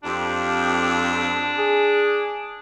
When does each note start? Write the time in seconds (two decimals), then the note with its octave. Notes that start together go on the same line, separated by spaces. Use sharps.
0.04 F2 D4 G4
1.58 G#4